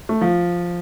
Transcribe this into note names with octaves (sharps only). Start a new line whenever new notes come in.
A3
F3